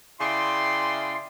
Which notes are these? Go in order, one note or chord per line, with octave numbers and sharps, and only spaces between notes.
C#3 E4 D5 G5 C6